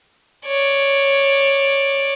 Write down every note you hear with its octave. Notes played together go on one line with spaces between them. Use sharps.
C#5 D5